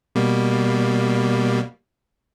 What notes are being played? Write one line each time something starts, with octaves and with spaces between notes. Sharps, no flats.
B2 G3 A#3